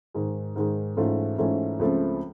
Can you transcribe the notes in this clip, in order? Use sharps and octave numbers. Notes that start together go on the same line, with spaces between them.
G#2 D#3 G#3
G#2 D#3 G#3
G#2 E3 A3 C#4 F4
G#2 E3 A3 C#4 F4
C#2 C#3 F3 A3 C4